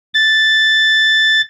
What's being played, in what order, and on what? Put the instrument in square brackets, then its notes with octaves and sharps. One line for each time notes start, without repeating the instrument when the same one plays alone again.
[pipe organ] A6